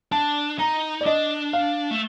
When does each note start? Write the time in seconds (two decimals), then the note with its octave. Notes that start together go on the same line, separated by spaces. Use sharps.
0.11 D4 A5
0.59 D#4 A#5
1.01 D5
1.06 D4 D#5
1.53 F5
1.91 A3